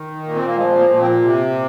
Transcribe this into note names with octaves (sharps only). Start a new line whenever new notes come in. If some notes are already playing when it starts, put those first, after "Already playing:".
Already playing: D#3
A#2
C4
A#3
F3 G#3
A#3
A#2
C4
C3